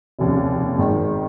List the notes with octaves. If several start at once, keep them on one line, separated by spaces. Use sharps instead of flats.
F1 D#2 C#3
G#1 G#2 D#3